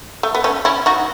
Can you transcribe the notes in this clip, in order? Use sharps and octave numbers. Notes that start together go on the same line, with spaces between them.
A3
B3
A3 C#4
C#4 E4
D#4 F#4